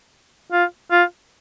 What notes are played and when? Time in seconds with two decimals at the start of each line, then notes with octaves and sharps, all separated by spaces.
0.52 F4
0.91 F4